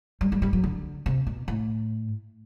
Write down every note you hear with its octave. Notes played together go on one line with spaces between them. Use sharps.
G3
G3
G3
F#3
D3
C3
B2
A2